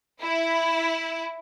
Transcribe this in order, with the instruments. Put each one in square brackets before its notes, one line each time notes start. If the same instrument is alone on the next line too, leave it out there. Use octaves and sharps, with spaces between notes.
[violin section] E4